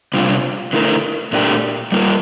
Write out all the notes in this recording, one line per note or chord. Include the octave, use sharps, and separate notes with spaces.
C3 G3 D4 F4
D3 A3 E4 A#4
A#2 A3 D4 G4 A#4
G3 A#3 F4 A#4